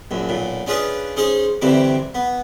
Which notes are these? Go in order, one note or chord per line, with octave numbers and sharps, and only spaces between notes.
A#1 F#2
B1 A#2
C#4 D4 F4 G#4 B4 D#5
C#4 D#4 G#4 C5 C#5
D2 G2 C3 E3 C4 D6
B3